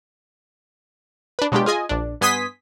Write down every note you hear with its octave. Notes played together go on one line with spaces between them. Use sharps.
D4 B4
B2 F#3 G#3 D4 F4 G4
F4 G#4 D#5 G#5
A#1 D4
G2 B3 G#5 C6 D#6 B6